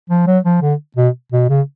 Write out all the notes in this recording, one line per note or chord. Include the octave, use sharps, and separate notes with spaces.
F3
F#3
F3
D3
B2
B2
C#3